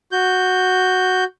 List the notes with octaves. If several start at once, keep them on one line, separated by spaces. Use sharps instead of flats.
F#4 G6